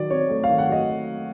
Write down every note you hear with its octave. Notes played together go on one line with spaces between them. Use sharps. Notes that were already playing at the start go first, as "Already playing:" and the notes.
Already playing: D#3 F#3 D5
C4 C#5
A3
F5
D#3
F#5
F#3
D#5